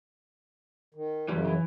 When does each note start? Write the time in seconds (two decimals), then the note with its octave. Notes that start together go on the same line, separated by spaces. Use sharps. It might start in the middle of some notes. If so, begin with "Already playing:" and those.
0.95 D#3
1.28 F#2 C#3 E3 G3
1.45 D#3 E3